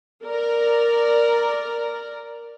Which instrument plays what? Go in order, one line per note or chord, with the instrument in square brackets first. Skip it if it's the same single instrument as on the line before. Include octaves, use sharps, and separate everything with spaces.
[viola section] A#4 D5